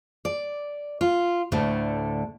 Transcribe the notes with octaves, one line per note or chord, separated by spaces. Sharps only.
D5
F4
D2 A2 D3 A3